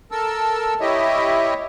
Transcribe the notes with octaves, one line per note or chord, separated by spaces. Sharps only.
A4 A#4 A5 E6
E4 G4 C#5 D#5 E5